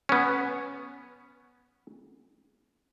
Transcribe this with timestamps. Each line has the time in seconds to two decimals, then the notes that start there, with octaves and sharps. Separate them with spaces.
0.09 B3 C#4